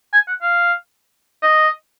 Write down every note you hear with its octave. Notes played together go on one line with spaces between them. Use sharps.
G#5
F#5
F5
D#5